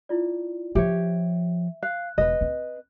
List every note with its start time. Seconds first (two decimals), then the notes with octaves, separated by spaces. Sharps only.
0.09 E4 F4 D5
0.75 F3 G4 C#5 E5
1.83 F5 F#6
2.18 E1 B4 D#5
2.41 C4